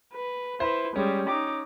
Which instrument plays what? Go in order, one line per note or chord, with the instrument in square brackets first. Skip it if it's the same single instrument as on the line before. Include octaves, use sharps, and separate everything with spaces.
[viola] B4
[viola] E4 B4 [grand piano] C5
[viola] G3 G#3 [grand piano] C#4
[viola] D#4 D6